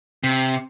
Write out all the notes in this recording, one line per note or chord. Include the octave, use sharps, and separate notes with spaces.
C3